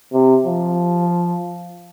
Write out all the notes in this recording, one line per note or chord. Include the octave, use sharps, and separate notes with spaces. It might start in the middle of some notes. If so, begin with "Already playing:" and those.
C3
F3